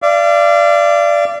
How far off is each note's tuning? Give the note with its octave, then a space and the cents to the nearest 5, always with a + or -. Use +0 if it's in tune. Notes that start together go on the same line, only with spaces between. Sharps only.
D5 +0 F5 -40